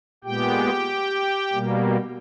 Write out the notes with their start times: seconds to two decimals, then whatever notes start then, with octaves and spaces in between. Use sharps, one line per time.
0.24 A#2 G#3 B3 G4 G5
1.52 B2 G3 A#3